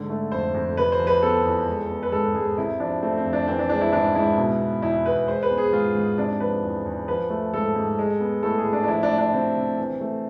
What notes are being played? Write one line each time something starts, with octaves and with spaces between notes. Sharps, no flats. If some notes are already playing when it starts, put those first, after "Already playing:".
Already playing: G#2 D3
A3
F2 C5
F2
C3 B4
C5
F3
B4
B3 A4
E2
G#3
B3
B4
G#2 A4
G#2 G#4
C3 E4
F3 D4
A3 C4
C4
F2
D4
E3 C4
D4
G#3 D4
E4
G#2 D4
G#2 E4
B2
B3
E2 E4
E2 B4
G#3 C5
B4
B3
G#4
G#2 F4
G#2
C3 D4
F3 B4
E2
E2
F3 B4
A3
G#2 A4
G#2
G#3
B3
A2 A4
G#4
A2
D4
D4
F3 E4
D4
A3
D4
C3 C4
C3
E3
A3